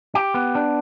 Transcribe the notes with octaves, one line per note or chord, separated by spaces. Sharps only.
G4
B3
D4